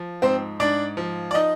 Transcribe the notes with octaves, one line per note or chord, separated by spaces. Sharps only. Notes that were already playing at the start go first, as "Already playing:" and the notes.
Already playing: F3
G#2 C4 C5
G#2 D4 D5
F3
D5
D#4 D#5